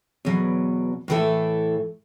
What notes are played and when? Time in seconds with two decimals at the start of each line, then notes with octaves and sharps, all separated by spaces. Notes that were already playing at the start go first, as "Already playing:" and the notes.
0.25 E2 B2 F#3
1.08 A2 E3 A3 E4 A4